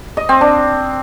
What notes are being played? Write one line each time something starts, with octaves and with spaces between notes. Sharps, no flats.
D#5
C4
D4